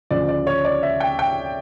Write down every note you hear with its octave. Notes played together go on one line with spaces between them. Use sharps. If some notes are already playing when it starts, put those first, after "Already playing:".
D2 C#3 F3 D5
D5
C#5
D5
E5
G5
G5